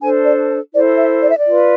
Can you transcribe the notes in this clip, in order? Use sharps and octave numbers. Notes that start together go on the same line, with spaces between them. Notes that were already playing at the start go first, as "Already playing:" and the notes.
D4 A4 C5 G#5
D5
E4 A4 C5 D5
E5
D5
E5
D5
F4 B4